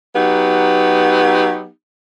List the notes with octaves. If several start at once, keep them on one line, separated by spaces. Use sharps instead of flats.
F#3 B3 D#4 G4